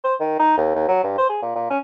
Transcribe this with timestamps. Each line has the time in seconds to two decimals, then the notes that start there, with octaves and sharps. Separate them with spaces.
0.04 C5
0.20 D#3
0.39 D#4
0.57 D#2
0.75 D#2
0.88 F#3
1.03 G2
1.18 C5
1.29 G#4
1.42 A#2
1.55 A#2
1.70 C#4